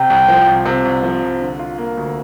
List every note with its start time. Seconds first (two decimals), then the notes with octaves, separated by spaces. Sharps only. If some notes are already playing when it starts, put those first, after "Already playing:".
Already playing: C3 G5
0.10 C2
0.28 F3
0.47 C2
0.66 C3
0.85 C2
1.03 F3
1.22 C2
1.41 D3
1.59 F4
1.78 A#3
1.97 D2